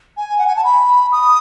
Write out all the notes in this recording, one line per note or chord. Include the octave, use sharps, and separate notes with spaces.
G#5
F#5
G#5
A5
B5
D#6